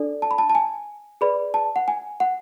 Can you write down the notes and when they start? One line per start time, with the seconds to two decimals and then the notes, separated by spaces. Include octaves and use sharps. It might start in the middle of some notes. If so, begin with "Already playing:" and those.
Already playing: D4 A4 D5
0.22 A5
0.31 B5
0.38 A5
0.50 A5
0.55 G#5
1.21 G#4 B4 D5 B5
1.54 A5
1.76 F#5
1.88 G#5
2.20 F#5